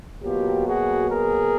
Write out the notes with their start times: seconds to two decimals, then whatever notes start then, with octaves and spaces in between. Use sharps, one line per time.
0.23 B2 F#3 A#3 F4 G4
0.66 F#4 G#4
1.09 G#4 A#4